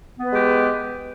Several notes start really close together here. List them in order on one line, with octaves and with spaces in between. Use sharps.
B3 B4 G#3 G4